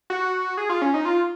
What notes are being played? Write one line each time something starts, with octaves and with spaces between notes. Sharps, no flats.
F#4
G#4
F4
C#4
D#4
F4